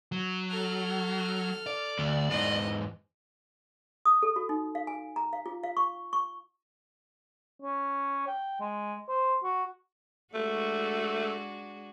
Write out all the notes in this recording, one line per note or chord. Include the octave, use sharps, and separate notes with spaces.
F#3
A4 F6
D5
D2
E2 G#2 D#5
D#6
A4
F#4
D#4
F5
G#5
A#5
F5
F4
F5
C#6
C#6
C#4
G5
G#3
C5
F#4
G#3 A3 D4 F#4